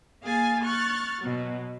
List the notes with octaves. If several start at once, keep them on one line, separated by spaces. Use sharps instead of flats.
A#3 G#4 F5 G#5 A6
C#6 F6 F#6 A6
B2 F#3